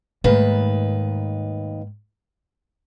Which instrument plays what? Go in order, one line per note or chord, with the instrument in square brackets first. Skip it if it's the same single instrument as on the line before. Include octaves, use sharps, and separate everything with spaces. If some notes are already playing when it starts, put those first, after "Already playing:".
[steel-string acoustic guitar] D#2 D#3 B4 [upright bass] G#2 A3